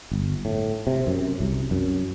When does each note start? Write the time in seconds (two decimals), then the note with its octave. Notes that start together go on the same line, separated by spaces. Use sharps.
0.11 G1
0.45 A2
0.87 C3
1.07 F#2
1.40 C2
1.71 F#2